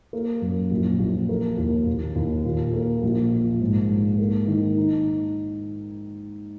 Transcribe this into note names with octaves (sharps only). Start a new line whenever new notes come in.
A#3
F#2
A#1
A#1
A#3
D#2
D#2
D#2
A#2
A#3
A#1
A#2
G#2
G#2
A#3
D#3
D#4